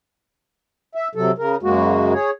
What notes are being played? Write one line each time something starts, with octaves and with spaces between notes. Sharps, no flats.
E5
C3 F#3 A4
C#3 A#4
F#2 C#3 G#3 A#3 F#4
G#4 C#5